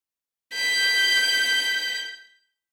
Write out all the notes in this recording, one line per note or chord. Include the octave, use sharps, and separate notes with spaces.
G6 B6